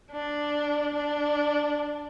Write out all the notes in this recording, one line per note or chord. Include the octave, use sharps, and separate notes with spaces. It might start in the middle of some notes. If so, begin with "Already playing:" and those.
D4
D4